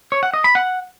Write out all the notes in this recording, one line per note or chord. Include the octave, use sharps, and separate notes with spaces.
C#5
F#5
D#5
B5
F#5